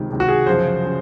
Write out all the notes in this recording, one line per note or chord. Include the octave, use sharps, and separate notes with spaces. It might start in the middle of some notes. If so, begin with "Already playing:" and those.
Already playing: C#2 C3 D#3
C#2 C3 D#3
F#4
G#4
F#2 C#3 F3 C5
C#3